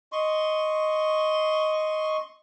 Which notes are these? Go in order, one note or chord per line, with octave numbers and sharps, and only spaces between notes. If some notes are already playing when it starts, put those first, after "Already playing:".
D#5 C6 C#6